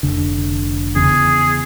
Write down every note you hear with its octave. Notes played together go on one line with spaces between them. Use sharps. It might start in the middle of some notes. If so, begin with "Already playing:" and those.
F1 D3
E2 C#3 G#4